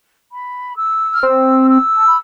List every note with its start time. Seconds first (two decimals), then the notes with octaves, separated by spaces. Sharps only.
0.31 B5
0.77 E6
1.13 F6
1.23 C4 E6
1.69 E6
1.97 A5
2.06 B5